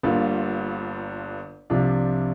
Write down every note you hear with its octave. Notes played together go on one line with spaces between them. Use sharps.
G1 G2 D3 A#3 F4
C2 C3 F3 D4 F4